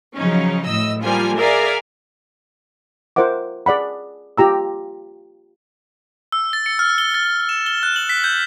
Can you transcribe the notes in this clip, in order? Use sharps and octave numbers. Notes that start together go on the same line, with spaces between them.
C#3 F3 F#3 C#4 D#4
A2 D#5 E6
F3 G3 A#3 F4 G#5
G#4 A#4 D5 E5 F5 G#5
F4 A#4 C5 E5 F#5 D6
G#4 D5 F#5 B5
F4 G4 A#5 E6
E6
A6
C#7
F6
G7
A6
E7
G7
F#6
F#7
B6
G6